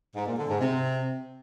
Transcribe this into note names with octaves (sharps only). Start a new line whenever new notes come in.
G#2
A#2
D3
G#2
C3